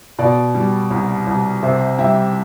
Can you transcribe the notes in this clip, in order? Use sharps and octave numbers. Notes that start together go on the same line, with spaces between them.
B2 D5
G3
C2
C2
C3 C5 E5
G3 E5 G5